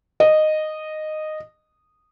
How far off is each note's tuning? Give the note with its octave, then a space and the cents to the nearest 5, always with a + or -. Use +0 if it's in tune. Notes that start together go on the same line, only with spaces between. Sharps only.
D#5 -10